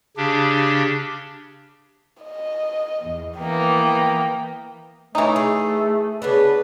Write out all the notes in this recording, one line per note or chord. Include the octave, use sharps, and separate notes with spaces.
C#3 D4 G4
D#5
E2
E3 A#3 B3 G5
E3 A3 D#4 C#5 D#5
G#4
C#3 B3 D4 B4